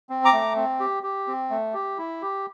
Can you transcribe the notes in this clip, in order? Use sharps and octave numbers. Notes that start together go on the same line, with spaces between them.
C4
A#5 D6
A3
C4
G4
G4
C4
A3
G4
E4
G4